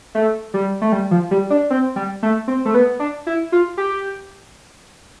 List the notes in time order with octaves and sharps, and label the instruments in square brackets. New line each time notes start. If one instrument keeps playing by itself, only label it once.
[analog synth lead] A3
G3
A3
G3
F3
G3
D4
C4
G3
A3
C4
A3
B3
D4
E4
F4
G4